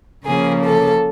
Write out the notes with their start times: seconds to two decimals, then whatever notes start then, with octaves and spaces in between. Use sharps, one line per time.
0.25 C#3 F3 A#3 G#4
0.64 A4